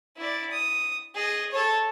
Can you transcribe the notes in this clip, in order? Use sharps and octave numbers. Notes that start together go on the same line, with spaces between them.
E4 D5
D#6
G#4 D#5
A4 C#5